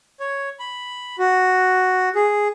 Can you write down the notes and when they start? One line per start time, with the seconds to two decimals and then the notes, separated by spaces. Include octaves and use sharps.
0.20 C#5
0.60 B5
1.19 F#4
2.15 G#4